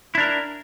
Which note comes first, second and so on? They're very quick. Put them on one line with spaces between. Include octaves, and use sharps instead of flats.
E4 D4 A#4